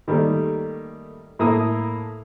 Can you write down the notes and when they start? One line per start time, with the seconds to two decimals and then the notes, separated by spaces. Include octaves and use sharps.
0.08 D#3 G3 A3 A#3
1.39 A2 A#3 D#6